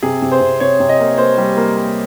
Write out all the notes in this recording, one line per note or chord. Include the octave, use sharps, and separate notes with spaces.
C3 G#4
C3
C5
C3
C3 C#5
C3
D#5
A#3
A#3 C5
G3
A#3
A#3